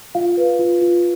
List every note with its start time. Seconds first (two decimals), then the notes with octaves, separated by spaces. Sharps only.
0.15 F4 F5
0.37 B4
0.59 F4
0.82 F4